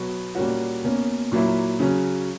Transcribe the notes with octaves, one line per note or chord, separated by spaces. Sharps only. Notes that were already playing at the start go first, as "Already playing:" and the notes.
Already playing: B2 F#3 B3
A#2 G3 A#3 C#4 F#4
B2 A#3 C#4
A#2 F#3 A#3 E4
C#3 F#3 C#4